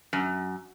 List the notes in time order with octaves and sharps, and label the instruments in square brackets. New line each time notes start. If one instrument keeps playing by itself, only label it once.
[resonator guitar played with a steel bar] F#2